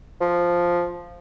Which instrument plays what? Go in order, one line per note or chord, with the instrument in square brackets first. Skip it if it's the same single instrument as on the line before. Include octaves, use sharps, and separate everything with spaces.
[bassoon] F3